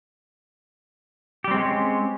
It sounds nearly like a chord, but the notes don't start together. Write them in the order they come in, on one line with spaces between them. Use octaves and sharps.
G4 G3 C4 G#3 C#4